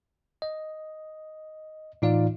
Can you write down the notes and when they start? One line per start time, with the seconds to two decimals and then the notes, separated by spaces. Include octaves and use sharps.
0.42 D#5
2.02 A2 E3 D#4 F4 D5 F5